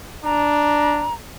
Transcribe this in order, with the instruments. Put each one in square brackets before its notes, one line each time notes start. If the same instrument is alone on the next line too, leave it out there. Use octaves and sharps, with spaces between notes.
[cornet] D4 [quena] A#5